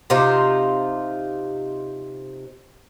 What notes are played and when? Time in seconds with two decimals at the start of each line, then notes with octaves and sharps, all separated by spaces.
0.10 C3 D#4 F4 C5